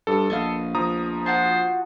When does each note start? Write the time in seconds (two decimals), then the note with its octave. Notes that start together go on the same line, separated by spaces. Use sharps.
0.07 G2 A4
0.30 A#1 B3 D#5 F5
0.75 F3 A#5 D#6
1.26 F4 F#4 C5 A5